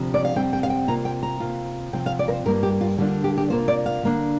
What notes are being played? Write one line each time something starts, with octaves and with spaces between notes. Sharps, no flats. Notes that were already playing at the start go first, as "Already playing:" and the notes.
Already playing: D2 C3 F3
D5
F5
F2 C3 G3 C4 G5
G5
F5
G5
C3 A#3 F4 A#5
G5
A#5
C3 A#3 F4
C3 F3 C4 F4 G5
F5
D5
A#4
C5
G2 G3 A#3 F4 A#4
G4
F4
D3 G3 A#3 D4 F4 G4
G4
G4
C3 A#3 F4 C5
D5
F5
D3 A#3 D4